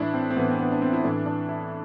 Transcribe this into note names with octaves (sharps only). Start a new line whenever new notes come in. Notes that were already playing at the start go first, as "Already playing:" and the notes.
Already playing: A2 E3 D4 E4
C4
C4
A2 E3 B3
C4
B3
D4
C4
E4
A2 E3 D4
D4
E4